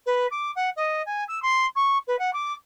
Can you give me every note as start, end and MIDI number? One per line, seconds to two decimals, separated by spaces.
0.06 0.27 71
0.31 0.51 86
0.55 0.69 78
0.76 1.02 75
1.06 1.24 80
1.28 1.42 88
1.42 1.66 84
1.75 1.98 85
2.07 2.18 71
2.19 2.30 78
2.33 2.53 86